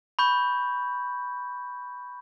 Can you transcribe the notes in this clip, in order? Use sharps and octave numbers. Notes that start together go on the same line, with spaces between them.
B5 C#6 G6